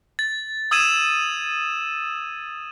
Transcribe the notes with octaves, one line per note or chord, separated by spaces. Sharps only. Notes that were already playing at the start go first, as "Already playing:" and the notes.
A6
D#6 E6 G#6 D#7 E7